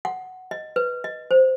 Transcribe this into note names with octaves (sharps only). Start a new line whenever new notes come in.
F#5
D#5
B4
D#5
C5